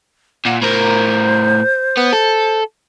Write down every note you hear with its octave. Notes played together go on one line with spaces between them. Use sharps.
A#2 F#5
A2 A#4 C5
B3
A4